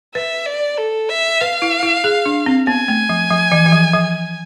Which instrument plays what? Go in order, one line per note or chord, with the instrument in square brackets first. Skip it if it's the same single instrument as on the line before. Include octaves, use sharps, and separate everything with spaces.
[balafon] B4 [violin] E5
[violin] D5
A4
E5
[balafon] B4 [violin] F5
[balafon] E4
E4
G#4
D4
C4
[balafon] B3 [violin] G#5
[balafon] A3
F3
F3
E3
E3
F3
F3